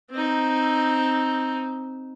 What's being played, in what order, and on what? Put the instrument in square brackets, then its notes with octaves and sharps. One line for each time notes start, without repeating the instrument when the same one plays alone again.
[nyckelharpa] C4 D#4